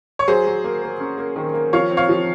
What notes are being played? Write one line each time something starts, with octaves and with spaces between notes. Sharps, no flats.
C#5
F#3 G#4 C5
F#3
A#3
A#3
C#4
A#3
D#3
A#3
F3 C#5 F5
C4
C#5 F5
F3